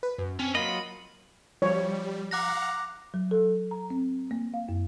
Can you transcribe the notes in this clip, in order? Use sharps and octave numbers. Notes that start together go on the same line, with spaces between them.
B4
F#2
C4 C#4
F#3 A#3 F4 D#5 B5
F3 G3 C#5
F5 F#5 A#5 D6 F#6 A#6
F#3
A4
A#5
C4
A#3
F5
F#2